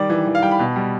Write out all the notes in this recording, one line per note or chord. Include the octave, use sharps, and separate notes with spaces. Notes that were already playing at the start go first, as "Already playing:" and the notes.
Already playing: D#3 G3 D5
E3
E3
F5
G3 G5
B5
B2
G3